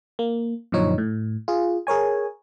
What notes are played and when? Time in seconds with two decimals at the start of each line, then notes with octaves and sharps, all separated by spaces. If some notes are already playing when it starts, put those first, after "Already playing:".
0.19 A#3
0.72 F#2 A#2 D3 F3 D#4 C#5
0.98 A2
1.48 F4 G#4
1.87 G#4 A#4 C#5 G#5